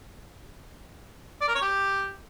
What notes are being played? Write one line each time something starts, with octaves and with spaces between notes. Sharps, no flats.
D5
A#4
C#5
G4